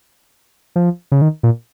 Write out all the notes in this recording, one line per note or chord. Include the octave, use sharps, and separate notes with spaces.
F3
C#3
D#3
A#2